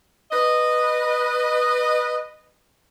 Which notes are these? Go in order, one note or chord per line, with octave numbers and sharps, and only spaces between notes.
B4 D#5